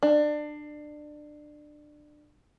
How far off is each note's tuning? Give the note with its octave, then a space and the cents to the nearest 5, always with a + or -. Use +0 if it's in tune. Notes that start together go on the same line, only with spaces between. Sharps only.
D4 +25